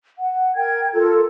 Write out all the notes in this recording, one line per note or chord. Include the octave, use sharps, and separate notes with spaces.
F#5
A#4 G5 G#6
F4 A4 A#4